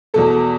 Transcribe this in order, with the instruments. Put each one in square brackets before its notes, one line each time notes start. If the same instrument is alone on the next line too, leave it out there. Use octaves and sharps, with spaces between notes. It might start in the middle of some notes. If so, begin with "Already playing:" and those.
[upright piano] E2 B2 A3 A4